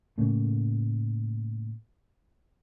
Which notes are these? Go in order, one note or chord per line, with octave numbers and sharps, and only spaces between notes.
A2 C#3 A3 A#3